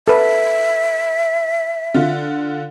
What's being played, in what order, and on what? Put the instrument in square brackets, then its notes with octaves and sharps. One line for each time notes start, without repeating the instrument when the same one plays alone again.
[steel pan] A4 B4 [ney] E5
[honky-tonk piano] D3 F4